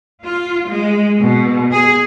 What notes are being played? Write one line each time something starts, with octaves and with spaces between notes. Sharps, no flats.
F4
G#3
B2
G#4